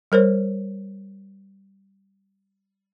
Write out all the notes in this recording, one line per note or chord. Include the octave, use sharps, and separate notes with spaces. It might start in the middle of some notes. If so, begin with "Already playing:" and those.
G3 A#4 C5 C#5